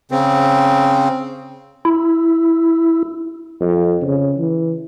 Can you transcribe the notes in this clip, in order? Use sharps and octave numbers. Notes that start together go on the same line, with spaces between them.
C#3 C4
E4
F2
C#3
E3